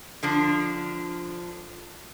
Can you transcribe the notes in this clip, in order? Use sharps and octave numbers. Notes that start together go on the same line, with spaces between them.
D3 F3 D4